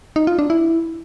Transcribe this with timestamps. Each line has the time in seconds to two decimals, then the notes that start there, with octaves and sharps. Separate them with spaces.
0.16 D#4
0.27 F4
0.39 D4
0.50 E4